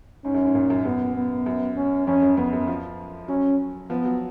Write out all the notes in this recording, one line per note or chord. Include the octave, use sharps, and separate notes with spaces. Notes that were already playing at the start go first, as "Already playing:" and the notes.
G#2 C#4
F#2
G#2
A#2
F#2
F#2 B3
B3
F#2
C#4
F2 C#4
F#2
F2 B3
F#2
F3
F#3 C#4
F3 B3
F#3